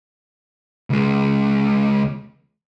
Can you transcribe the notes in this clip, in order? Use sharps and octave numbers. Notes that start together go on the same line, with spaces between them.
C#2 G#3